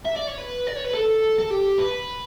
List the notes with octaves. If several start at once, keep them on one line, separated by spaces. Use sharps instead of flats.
E5
D5
C#5
B4
D5
C#5
B4
A4
A4
G4
B4